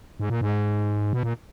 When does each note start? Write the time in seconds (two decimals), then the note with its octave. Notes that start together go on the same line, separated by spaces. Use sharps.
0.20 G#2
0.30 A#2
0.41 G#2
1.13 B2
1.23 A#2